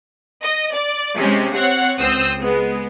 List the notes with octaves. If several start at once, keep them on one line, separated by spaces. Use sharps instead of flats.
D#5
D5
C3 G#3 C#4
C4 C#5 F#5
C#2 C4 D#6 E6 G6
G#3 B3